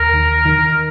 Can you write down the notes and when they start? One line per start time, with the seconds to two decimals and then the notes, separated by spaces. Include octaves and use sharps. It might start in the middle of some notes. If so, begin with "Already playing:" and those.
Already playing: D#2 A#4
0.13 D#3
0.45 D#3